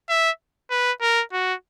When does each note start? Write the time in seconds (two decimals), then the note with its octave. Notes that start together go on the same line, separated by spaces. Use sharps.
0.09 E5
0.71 B4
1.01 A#4
1.33 F#4